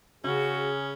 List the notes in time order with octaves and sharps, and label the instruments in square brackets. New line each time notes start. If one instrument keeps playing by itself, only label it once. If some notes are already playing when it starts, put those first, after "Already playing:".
[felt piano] C#3 [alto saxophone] C#4 [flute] F#4 [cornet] G#4